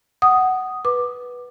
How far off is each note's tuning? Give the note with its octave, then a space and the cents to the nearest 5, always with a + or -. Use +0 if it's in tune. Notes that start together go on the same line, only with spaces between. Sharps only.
F#5 +10 D#6 +0
B4 -5 D6 +15